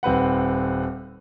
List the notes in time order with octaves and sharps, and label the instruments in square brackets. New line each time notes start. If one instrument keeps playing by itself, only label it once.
[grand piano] D#1 C4 B4 F#5